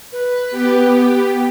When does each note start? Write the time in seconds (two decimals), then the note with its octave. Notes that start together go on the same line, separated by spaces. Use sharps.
0.12 B4
0.51 B3 G4